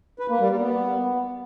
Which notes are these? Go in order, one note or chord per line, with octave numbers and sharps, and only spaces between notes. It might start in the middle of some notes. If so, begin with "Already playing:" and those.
B4
A#3
G3
G3
B3